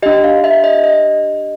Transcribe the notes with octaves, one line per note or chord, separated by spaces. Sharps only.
D4 G4 D#5
F5
E5
D#5
D#5